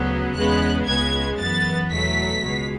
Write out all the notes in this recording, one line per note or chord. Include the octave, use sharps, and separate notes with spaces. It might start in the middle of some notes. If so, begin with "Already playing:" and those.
Already playing: D2 C#3 F#3 B3
E2 C#3 G#3 B3 F#6
C#2 C#3 G#3 B3 G#6
F#2 E3 B3 A6
E2 B2 F#3 A3 B6
C#2 B2 G#3